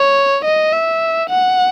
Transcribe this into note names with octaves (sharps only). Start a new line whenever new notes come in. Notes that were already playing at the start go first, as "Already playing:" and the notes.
Already playing: C#5
D#5
E5
F#5